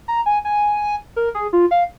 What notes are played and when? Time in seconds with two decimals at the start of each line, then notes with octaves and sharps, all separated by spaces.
0.08 A#5
0.26 G#5
0.45 G#5
1.16 A#4
1.35 G#4
1.53 F4
1.71 F5